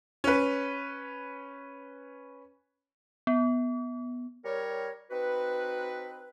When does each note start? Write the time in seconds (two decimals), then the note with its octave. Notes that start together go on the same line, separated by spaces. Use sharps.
0.24 C#4 B4
3.27 B3
4.45 G3 A#4 C#5
5.10 C4 D#4 F#4 B4